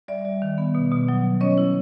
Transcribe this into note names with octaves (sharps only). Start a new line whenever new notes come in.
G3 D5 E5
G3
D#3
B3
B2
B2
F#3
B2
C#4 C#5 D#5
E4